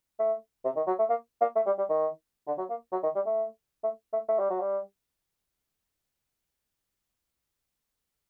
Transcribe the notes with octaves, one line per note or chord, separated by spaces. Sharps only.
A3
C3
D#3
F#3
A3
A#3
A#3
A3
G3
G3
D#3
D3
F#3
A#3
F#3
D#3
G3
A3
A3
A3
A3
G3
F#3
G3